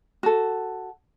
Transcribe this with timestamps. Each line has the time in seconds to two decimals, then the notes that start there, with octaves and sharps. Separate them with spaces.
0.23 F#4 A4